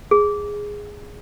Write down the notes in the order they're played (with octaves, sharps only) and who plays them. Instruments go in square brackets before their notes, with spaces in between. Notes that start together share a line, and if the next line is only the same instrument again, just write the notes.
[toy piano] G#4